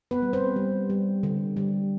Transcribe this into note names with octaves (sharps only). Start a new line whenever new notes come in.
B3 B4
G3
C4 C5
G3
G3
D3
G3